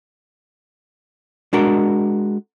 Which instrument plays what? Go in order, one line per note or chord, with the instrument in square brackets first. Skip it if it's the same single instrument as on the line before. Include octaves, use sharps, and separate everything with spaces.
[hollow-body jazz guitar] G#3 D4 F#4 A#4